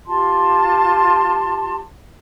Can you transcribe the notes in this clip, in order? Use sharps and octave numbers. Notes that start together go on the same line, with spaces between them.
F4 G4 A5 C6